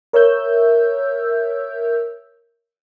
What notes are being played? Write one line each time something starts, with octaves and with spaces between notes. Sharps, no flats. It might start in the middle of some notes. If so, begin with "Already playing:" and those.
A#4 C#5 E5 E6 G6